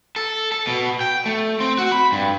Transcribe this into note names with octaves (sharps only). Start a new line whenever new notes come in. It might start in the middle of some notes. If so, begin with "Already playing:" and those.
A4
A4
B2
G5
A3
C4
F#4
B5
G2